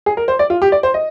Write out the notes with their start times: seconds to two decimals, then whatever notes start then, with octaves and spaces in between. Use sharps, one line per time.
0.06 G#4
0.17 A#4
0.28 C5
0.39 D5
0.50 F4
0.62 G4
0.72 D5
0.83 C5
0.94 D#5